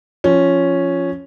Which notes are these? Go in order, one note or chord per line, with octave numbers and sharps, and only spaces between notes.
F3 C#4